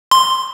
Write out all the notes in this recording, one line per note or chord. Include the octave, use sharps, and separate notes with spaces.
C6